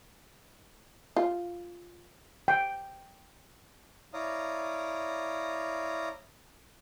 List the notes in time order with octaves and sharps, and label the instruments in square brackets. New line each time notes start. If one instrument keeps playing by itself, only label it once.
[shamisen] F4
[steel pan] G5
[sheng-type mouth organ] E4 C#5 D5 F5 A#5 D#6